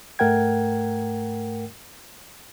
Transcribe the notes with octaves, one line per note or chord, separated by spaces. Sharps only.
G#2 A3 A#4 F#5 G5 G#6